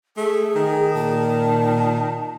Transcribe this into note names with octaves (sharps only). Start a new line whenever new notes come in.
A3 G#4
D#3
A#2 A5